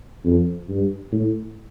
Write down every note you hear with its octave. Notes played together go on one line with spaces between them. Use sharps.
F2
G2
A2